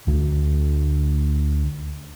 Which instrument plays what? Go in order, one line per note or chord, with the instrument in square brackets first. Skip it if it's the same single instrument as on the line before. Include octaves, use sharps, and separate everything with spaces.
[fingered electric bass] D2 D3 A3